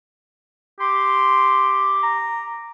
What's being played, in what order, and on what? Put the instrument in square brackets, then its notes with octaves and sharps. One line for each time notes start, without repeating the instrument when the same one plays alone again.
[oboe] G4 [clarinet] C6
[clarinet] A#5